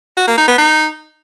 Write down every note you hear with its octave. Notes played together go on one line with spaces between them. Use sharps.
F#4
A#3
D#4
B3
D#4